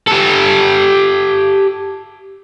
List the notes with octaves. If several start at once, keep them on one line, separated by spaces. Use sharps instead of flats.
G4 A4